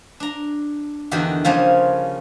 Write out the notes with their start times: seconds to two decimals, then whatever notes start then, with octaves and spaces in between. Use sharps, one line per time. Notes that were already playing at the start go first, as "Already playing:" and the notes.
0.20 D4 A#5
1.11 E2 D3 D#3 F#4 G4 G5
1.45 C#3 F3 G3 A#3 C#4 C5